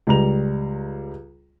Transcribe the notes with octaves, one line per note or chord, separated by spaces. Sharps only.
C#2 G3 A#5 F7